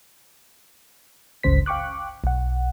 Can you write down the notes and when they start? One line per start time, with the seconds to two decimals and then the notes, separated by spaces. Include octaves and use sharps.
1.43 G1 C#2 G2 C#3 C5 B6
1.66 F5 G5 C#6 D6 F#6
2.24 B1 F#5